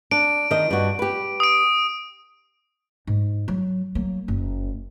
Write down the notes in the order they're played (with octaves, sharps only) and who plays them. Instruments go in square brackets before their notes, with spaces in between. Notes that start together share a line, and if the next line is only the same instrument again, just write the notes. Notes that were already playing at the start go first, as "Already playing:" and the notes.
[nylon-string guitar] D4 [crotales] D7
[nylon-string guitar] D#3 D#5
G2 F#4
G4 B4
[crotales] D#6 D7
[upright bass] G#2
F#3
F#3 A#3
F#1